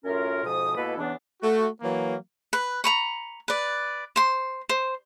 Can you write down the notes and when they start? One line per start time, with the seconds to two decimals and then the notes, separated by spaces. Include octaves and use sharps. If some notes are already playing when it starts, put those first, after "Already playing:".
0.04 F#2 A2 C#4 F4 A#4
0.45 F2 G#2 B2 F3 D#6
0.77 B2 G#3 A#3 E4 A4 B4
0.98 E2 C#3 E3 B3 D4
1.42 A3 F#4
1.82 E3 F#3 A#3
2.53 B4
2.84 A#5 B5 C#6
3.48 B4 D5
4.16 C5 C6
4.69 C5